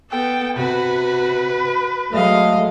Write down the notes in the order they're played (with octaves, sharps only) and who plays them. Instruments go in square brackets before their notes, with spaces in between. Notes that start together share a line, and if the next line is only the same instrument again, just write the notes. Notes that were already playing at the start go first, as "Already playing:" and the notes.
[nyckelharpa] B3 A4 [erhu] G5
[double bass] C3 [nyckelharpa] F#4 [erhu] B4
[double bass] F#3 G#3 [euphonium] A3 [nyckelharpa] D#5 F5